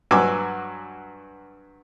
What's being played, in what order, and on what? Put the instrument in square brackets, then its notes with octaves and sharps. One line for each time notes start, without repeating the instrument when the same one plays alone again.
[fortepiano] G2 F#3 G#5 D6 E6